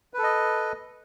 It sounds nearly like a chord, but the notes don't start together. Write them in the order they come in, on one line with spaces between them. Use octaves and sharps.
B4 A4 D#5